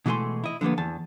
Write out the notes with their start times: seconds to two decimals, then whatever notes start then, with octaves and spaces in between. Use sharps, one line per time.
0.06 B2 E3 G#3 A3 G#5 C6
0.44 E4 D#5
0.61 D3 F3 G3 A#3 B3
0.78 E2 A5